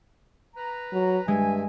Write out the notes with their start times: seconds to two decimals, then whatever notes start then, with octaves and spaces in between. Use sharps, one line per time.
0.56 B4 A#5
0.93 F#3
1.28 G2 G#3 E5 G#5